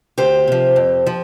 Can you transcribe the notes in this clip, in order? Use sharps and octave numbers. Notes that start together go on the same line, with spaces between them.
D2 G4 C5
C3 F3
F2
F3